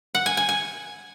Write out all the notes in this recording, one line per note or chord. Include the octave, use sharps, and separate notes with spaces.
F#5
G#5
G#5
G#5